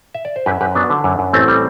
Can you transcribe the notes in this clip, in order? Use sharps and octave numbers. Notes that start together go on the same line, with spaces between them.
E5
D5
C5
F#2 G4 B4
F#2 G4 B4
F#3 B3 D4
D3
F#2
F#2
A1 A3 C4
G3